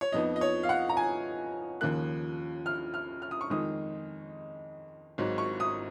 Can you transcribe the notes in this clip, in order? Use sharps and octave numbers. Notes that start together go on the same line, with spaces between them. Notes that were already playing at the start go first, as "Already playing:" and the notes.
C#5
F2 F3 B3 D#4 D#5
D#5
C#5
F5
F#5
A#5
G#5
D#2 C#3 F3 A#3 F#6
F6
F6
F6
D#6
C#6
F2 D#3 G#3 D#4 D#6
G#1 G#2 F#3
C#6
D#6